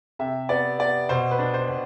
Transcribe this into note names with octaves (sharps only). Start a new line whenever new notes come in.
C3 E5
B3 D5
B3 D5
B2 C5
B4
D4
C5
B2